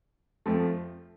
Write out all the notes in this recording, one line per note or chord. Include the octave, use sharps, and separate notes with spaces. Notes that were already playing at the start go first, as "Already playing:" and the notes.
F2 F3 A3